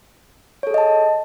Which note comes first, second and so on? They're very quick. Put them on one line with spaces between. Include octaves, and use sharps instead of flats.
C#5 A4 G#4 D#5 A5